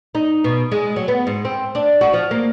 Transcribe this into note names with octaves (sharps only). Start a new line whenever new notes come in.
D#4
B2
G#3
F#3
B3
G#2
C4
D4
F#4
F3
A#3